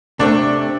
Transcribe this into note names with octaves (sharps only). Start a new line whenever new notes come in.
C3 A3 C4 D4